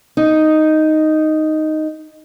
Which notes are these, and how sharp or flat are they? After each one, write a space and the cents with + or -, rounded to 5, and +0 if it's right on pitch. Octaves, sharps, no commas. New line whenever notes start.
D#4 +0